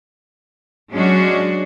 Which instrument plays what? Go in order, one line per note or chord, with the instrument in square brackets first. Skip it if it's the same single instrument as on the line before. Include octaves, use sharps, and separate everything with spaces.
[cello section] F#3 G#3 C#4 D4 F#4